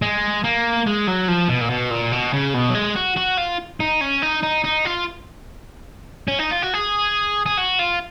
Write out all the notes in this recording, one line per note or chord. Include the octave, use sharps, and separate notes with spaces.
G#3
A#3
G#3
F#3
F3
B2
A#2
B2
A#2
B2
C#3
B2
F#3
G#3
F#4
F#4
F4
D#4
C#4
D#4
D#4
D#4
F4
C#4
D#4
F4
F#4
G#4
G#4
F#4
F4